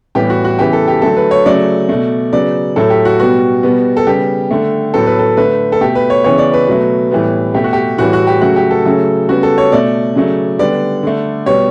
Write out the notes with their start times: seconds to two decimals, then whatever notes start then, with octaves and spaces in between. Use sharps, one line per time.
0.15 A2 E3 G3 B3 G4
0.30 F#4
0.44 F#4
0.59 C#3 E3 B3 G4
0.73 A4
0.88 G4
1.02 D3 F#3 A3 A4
1.17 B4
1.31 C#5
1.46 C#3 F#3 A3 D5
1.89 B2 A3
2.33 C#3 F#3 B3 D5
2.76 A2 F#3 A3 A4
2.90 G4
3.05 F#4
3.20 B2 G3 B3 F#4
3.63 B2 G3 B3
3.97 A4
4.07 C#3 G3 B3 G4
4.51 D3 A3
4.94 A2 F#3 B3 A4
5.06 B4
5.19 A4
5.37 D3 A3 B4
5.72 A4
5.81 B2 A3 G4
5.95 B4
6.10 C#5
6.24 C#3 E3 B3 C#5
6.38 D5
6.54 B4
6.68 B2 F#3 A3
7.11 A2 E3 G3 B3
7.54 B2 A3 G4
7.64 F#4
7.73 G4
7.98 A2 E3 G3 F#4
8.13 F#4
8.27 G4
8.41 C#3 F#3 A3 F#4
8.56 G4
8.71 A4
8.85 C#3 F#3 A3
9.29 C#3 G3 B3 F#4
9.43 A4
9.58 C#5
9.72 B2 A3 D5
10.16 C#3 F#3 A3
10.59 D3 G3 B3 D5
11.03 D3 A3
11.46 B2 G3 B3 C#5